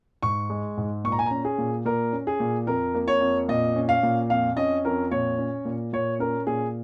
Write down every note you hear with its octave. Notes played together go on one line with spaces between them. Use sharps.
G#2 C#6
G#3
G#2
A#2 C#6
A#5
G#5
C#4 A#5
G#4
A#2
A#2 A#4
C#4
G#4
A#2
F2 A#4
A#3
C#5
F2
A#2 D#5
C#4
F5
A#2
F2 F5
C#4 D#5
F2 A#4
A#2 C#5
C#4
A#2
A#2 C#5
C#4 A#4
A#2 G#4